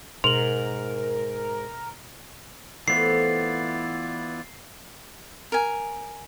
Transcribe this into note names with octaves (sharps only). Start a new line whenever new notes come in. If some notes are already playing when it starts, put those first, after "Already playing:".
G#2 B2 A#4 F7 F#7
E3 A3 B3 C4 E4 F4 D5 C7
A#4 G#5